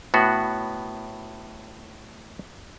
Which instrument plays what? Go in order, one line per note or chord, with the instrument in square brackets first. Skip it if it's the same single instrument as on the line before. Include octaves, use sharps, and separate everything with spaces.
[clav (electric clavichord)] A2 B3 F#4